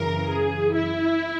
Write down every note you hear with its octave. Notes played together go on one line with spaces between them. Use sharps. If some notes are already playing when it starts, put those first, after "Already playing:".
Already playing: F#2 C#3 E3 A#4
G#4
E4